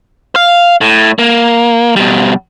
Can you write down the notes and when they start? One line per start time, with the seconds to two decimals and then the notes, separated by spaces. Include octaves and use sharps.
0.36 F5
0.81 A2
1.19 A#3
1.96 B2 G3